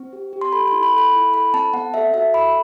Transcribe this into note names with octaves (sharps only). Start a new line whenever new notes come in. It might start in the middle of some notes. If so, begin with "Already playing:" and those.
Already playing: C4
G4
G4
C6
A4 B5
C6
E4
B5
A4 B5
E4
A4 B5
C4 A5
B3 F#5
A4 E5
F#4 E5
A4 B5